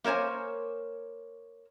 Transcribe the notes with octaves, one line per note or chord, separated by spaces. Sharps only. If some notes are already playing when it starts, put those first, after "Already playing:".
A#3 A#4 C5 C#5 G#5